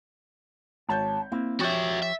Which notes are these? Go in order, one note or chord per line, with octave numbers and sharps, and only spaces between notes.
G#1 C#5 A5 G6
A#3 C4 E4
F3 F#4 G4 C#5 E5 A6
E5